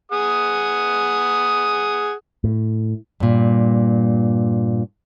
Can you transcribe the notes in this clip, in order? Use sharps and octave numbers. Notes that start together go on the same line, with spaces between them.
G#4 F#5 D#6
A2
G2 A#2